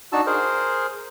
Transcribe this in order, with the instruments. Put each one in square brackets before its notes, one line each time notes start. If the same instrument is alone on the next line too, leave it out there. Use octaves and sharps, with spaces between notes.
[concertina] D4 D#4 F#4 A5 E6
G#4 A#4 C5